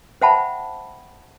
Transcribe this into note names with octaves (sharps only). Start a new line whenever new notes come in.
C5 E5 F#5 G5 A5 B5